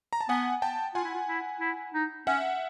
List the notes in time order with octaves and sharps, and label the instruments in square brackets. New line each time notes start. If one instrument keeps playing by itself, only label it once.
[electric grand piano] A#5
A5
[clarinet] B3 [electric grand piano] F#5 G#5
[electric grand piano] G5 A5
[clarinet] F4 [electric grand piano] F#5 G#5
[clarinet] E4
F4
E4
E4
D#4
[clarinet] C#4 [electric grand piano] E5 F#5